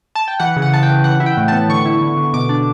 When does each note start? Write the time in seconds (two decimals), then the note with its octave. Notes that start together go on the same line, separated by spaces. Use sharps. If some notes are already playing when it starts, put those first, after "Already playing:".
0.15 A5
0.28 G5
0.40 E3 F#5
0.56 C#3
0.62 F#5
0.73 C#3 A5
0.83 G5
0.88 C#3
1.04 E3 F#5
1.20 E4
1.26 G5
1.37 A2
1.48 B3 A5
1.69 D3 C#6
1.86 E4
2.01 D3
2.17 D3
2.33 B2 D6
2.49 D4